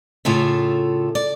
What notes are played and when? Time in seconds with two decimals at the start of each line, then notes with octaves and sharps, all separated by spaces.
0.25 A2 C#3 F4 A4 E5
1.15 D5